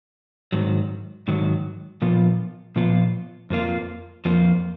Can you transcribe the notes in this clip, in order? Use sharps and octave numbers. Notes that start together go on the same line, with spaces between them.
G#2 D#3 F#3
G#2 D#3 F#3
A#2 F3 B3 F4
A#2 F3 B3 F4
F2 F3 A#3 F4
F2 F3 A#3 F4